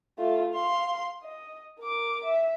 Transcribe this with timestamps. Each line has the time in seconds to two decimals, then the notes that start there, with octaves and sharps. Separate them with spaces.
0.19 A3 F4
0.52 F5 C6
1.23 D#5
1.80 A#4 D6
2.24 E5